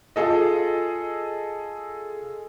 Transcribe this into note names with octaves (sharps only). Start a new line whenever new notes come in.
F4 G#4 A4 D#5